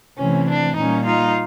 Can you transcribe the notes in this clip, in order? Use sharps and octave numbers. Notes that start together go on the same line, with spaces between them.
C3 E3 A3 C4 C#4
D4
A#2 G3 A#3 C#4 D#4
D#4 F4